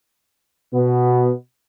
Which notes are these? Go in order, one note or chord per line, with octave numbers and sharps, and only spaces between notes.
B2 B3